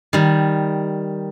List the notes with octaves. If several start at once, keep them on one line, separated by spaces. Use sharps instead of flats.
D#3 G3